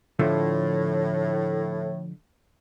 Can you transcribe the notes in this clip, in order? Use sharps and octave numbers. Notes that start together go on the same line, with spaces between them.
A2 D3 F3 A3